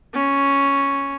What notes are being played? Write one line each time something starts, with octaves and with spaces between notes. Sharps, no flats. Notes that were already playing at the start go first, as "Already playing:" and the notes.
C#4